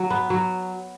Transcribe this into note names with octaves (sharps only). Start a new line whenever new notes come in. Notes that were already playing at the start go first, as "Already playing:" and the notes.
Already playing: F#3
B3
F#3